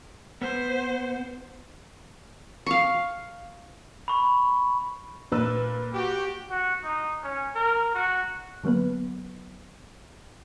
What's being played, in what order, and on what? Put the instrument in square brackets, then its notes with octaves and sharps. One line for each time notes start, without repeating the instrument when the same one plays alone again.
[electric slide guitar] B3 [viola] C5
[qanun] F5 C#6
[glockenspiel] B5 C#6
[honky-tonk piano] A#2 B4 E6
[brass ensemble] F#4 G4
[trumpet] F#4
D#4
C#4
A#4
F#4
[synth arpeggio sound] D3 F#3 A#3 B3 B4